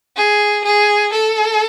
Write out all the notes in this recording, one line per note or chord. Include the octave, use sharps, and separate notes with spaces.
G#4
G#4
A4